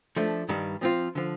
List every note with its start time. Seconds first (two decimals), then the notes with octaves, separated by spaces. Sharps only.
0.16 F3 A3 D4
0.49 G2 D#3 G3
0.81 F3 C4 F4
1.15 D3 F3